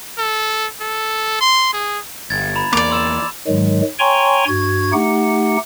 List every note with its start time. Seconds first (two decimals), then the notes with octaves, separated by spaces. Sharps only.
0.18 A4
0.81 A4
1.41 C6
1.73 G#4
2.30 G1 G#6 A6
2.55 A#5 B5
2.73 E2 A#3 D5 D6 F7
2.90 C6 E6 E7
3.47 G#2 D#3 F#3 G#3
3.99 C#5 G5 G#5 A#5 C6 C#6
4.48 G2 F#4 G#6
4.93 A3 D#4 G4 F#5